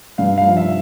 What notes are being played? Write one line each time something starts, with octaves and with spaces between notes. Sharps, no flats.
G2 F5
F5
F3
E5